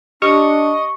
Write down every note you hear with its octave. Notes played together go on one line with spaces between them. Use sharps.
D4 G4 D#5 C#6